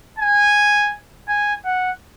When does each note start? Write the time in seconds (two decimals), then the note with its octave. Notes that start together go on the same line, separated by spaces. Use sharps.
0.19 G#5
1.28 G#5
1.65 F#5